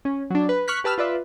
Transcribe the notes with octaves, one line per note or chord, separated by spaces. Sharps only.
C#4
F#3 D4
B4
C#6 F6 F#6 B6
G4 B4 A5 E6 F6
F4 B4 D5 E5